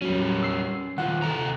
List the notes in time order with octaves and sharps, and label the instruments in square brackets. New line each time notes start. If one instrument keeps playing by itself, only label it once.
[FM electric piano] F#3 [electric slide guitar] G3 C#4
[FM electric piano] E6 C7
[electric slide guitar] D#3 F4 [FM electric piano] F#5
[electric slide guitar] C3 A4 A#5